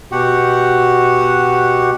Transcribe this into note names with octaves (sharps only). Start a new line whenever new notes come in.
B2 F#4 G4 F#5